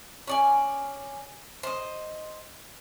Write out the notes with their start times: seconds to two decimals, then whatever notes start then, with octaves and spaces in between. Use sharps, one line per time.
0.27 C#4 D5 G#5
1.63 C5 D#5